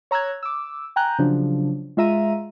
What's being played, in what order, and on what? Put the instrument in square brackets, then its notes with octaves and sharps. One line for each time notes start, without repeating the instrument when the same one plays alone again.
[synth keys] C#5 A#5 E6 F#6 G#6
D6 E6
G5 G#5 A#5 F#6 G6
C#3 F3 F#3 D4
G#3 F4 E5 A#5 D#7